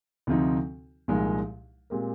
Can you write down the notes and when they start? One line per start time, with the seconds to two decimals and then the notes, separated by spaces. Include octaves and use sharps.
0.27 D2 C3 F3 C4 D#4
1.08 C2 A#2 F3 G#3 D#4
1.90 A#2 G#3 C4 G4 A#4